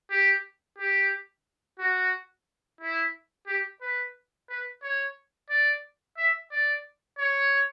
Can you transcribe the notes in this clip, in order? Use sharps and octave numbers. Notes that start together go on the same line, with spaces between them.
G4
G4
F#4
E4
G4
B4
B4
C#5
D5
E5
D5
C#5